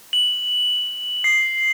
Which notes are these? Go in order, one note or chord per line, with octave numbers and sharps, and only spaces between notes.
F#7
C7